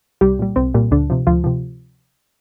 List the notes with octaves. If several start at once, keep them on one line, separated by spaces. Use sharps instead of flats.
C2 G3 G4
A#2 G3
C2 C4
A#2 G3
D2 D3 D4
C3 F3
D2 F3 F4
C3 F3